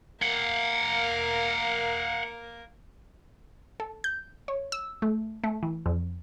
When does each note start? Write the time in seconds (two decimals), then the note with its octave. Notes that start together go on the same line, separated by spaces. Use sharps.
0.22 A#3 A#4 F5 F#5
3.80 A4
4.04 G6
4.48 C#5
4.72 E6
5.02 A3
5.44 A3
5.63 E3
5.86 F2